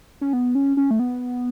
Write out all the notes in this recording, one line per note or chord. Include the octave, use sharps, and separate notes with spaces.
C#4
B3
C#4
C#4
A3
B3